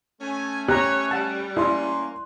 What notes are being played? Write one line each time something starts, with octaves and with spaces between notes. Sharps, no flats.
A3 C#4 G#5
G4 C#5 A#5 F#6
G3 F#5 A5
A#3 C#4 E4 D5 C6